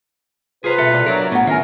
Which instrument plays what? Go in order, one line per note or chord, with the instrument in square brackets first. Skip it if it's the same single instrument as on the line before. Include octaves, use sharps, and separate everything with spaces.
[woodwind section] C3 F4 B4 [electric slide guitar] G#4 C5
[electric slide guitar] B2 A4 [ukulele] E5
[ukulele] E4 D5
[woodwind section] F#3 [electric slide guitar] D4 A#4 [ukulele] F#4 D5
[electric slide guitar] A2 B3 [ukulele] C#5 F#5
[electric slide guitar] D#3 C#4 F4 [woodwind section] A#4 [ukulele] E5 G#5